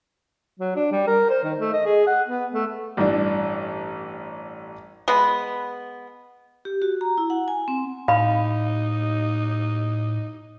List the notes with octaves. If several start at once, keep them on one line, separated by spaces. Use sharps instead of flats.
F#3
D4
G3
A#4
C5
D#3
A3
D#5
G#4
F#5
B3
A3
A1 G2 E3 D4
G#3 B3
G4
F#4
A#5
E4
F#5
G#5
C4
A2 D#4 F5 B5